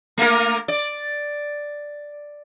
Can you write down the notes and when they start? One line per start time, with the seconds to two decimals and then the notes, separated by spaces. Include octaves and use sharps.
0.18 A3 A#3 A#4
0.68 D5